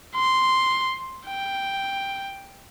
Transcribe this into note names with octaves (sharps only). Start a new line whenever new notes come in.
C6
G5